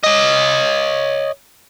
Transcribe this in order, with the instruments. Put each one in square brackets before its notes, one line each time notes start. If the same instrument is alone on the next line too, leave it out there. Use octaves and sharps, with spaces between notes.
[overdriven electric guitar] C#5 D#5